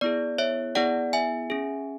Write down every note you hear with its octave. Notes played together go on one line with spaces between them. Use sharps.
B3 E4 G#4 D5
C#5 E5
B3 E4 G#4 D5 F#5
E5 G#5
C#4 G#4